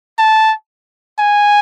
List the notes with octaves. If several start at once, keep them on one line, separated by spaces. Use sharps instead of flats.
A5
G#5